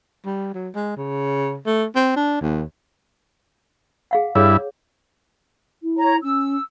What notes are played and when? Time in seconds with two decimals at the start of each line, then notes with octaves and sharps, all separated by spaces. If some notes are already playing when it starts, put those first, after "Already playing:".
0.26 G3
0.54 F#3
0.75 G#3
0.97 C#3
1.66 A3
1.96 C4
2.16 D4
2.41 D#2
4.11 G#4 F5 F#5
4.35 G2 E4 G#4 C#5
5.82 E4
5.97 C#5 A#5
6.22 C#4 E6